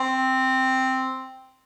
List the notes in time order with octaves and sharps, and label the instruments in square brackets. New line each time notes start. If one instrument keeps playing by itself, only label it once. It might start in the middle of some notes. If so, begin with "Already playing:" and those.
Already playing: [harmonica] C4